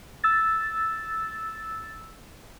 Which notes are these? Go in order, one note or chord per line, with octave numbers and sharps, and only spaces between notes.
E6 A6